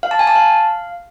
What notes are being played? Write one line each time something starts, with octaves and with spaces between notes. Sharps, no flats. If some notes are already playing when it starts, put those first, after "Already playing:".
F5
A5
G#5
A5
F5